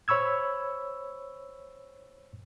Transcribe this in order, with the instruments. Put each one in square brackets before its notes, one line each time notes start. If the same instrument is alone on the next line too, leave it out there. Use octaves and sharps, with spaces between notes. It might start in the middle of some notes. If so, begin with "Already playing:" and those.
[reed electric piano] C5 C#5 B5 C#6 E6 G#6